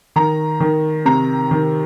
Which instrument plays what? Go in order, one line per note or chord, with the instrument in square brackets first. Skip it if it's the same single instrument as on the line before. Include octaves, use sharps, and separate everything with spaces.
[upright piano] D#3 A#5
D#3
C3 A#5
D#3